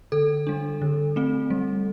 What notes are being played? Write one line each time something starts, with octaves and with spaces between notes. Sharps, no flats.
D3 A4
G3 D4
D3
A3 C4
G3